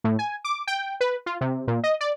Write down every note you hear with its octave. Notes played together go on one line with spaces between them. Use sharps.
A2
G#5
D6
G5
B4
F4
C3
A#2
D#5
D5